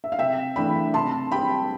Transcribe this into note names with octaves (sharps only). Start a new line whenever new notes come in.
E5
F5
C3 E5 G5
E3 A3 D4 G5 B5
C3 A5 C6
G3 C4 G5 B5